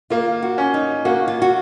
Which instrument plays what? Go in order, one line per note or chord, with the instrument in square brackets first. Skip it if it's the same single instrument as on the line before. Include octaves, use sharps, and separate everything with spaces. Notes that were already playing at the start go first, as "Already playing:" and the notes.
[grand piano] A#3 [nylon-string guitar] F4
[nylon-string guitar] F#4
[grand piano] C#4
[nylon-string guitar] D#4
[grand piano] A#3 [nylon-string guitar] F#4
[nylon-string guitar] F4
F#4